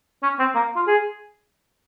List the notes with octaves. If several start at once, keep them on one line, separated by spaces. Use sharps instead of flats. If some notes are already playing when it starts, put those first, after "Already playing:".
C#4
C4
A#3
F4
G#4